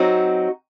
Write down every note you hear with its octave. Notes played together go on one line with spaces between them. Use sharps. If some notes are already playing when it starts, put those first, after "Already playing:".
Already playing: F#3 C4 D#4 F#4